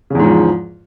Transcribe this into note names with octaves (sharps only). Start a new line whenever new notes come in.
E2 G#2 C#3 F3